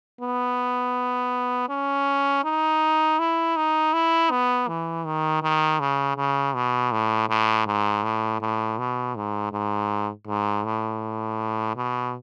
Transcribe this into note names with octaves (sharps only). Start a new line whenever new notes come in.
B3
C#4
D#4
E4
D#4
E4
B3
E3
D#3
D#3
C#3
C#3
B2
A2
A2
G#2
A2
A2
B2
G#2
G#2
G#2
A2
B2